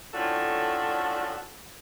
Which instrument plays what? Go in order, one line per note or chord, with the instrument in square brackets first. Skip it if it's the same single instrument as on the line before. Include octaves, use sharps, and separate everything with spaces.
[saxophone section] A2 F3 C#4 D4 F#4 A4